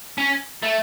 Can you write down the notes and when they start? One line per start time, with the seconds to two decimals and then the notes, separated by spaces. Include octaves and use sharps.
0.18 C#4
0.62 A3